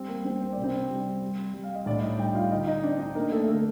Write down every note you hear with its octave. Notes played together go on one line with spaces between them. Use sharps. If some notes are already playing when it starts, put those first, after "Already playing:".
Already playing: G3 C4 C5
A#3 A#4
G3 C4 C5
C5
C3 D5
C4 C5
G3
G3
G3
F5
D#5
A2 D4 D5
D#4 D#5
G3 G4 G5
F4 F5
D3 D#4 D#5
D#4 D#5
C4 D4 D5
D#4 D#5
A#3 A#4
A3 A4
D3 A3 A4